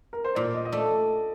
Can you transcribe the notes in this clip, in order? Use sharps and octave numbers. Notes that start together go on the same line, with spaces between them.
A#4
C5
A#2 D5
D#5
D#5
A3 D5